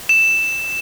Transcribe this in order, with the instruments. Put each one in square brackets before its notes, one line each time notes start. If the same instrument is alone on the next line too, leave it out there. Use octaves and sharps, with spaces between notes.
[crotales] E7